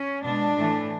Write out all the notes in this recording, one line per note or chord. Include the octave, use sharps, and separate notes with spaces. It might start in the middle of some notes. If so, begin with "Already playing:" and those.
Already playing: C#4
B2 G#3 D4
A2 E3 A3